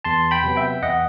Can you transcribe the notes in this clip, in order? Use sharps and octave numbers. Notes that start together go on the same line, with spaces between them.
E2 A5 C6
G5 B5
C3 F#3 B3
E5 G5
E2 D#5 F#5